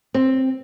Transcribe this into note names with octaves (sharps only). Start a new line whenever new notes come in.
C4